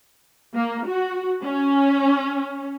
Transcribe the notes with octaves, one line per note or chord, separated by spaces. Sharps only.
A#3
F#4
C#4